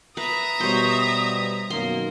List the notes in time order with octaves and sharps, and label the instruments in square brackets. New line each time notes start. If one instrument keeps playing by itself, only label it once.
[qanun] B4 [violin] E5 A#5 [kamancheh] D#6
[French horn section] B2 G3 [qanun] C5 C#5
[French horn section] F#2 B2 D#3 [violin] A#3 [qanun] C6